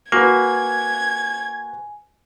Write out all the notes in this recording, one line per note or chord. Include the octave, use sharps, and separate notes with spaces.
A#3 F#4 B4 G#5 G#6